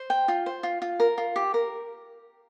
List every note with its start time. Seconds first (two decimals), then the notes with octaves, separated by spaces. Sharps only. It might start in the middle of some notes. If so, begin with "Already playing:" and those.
Already playing: C5
0.10 G5
0.28 F4
0.46 C5
0.63 F4
0.82 F4
1.00 A#4
1.18 F4
1.36 G4
1.54 A#4